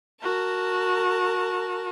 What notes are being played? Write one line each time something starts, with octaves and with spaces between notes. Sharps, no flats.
F#4 A#4 A5